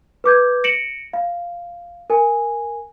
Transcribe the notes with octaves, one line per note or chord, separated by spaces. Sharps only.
B4 D6 G6 G#6
A#6 C#7 D7 E7 F#7
F5
A#4 G#5